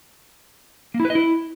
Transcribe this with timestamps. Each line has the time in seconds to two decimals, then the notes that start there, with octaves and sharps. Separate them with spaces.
0.94 A#3
1.00 E4
1.05 B4
1.10 D#5
1.15 E4